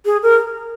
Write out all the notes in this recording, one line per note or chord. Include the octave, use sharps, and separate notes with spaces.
G#4
A#4